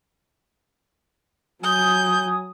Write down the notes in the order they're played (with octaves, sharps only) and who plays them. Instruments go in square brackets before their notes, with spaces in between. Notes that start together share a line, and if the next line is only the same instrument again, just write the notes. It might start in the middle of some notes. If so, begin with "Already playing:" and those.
[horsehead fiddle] F#3 G#5 [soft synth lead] D#6 [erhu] G6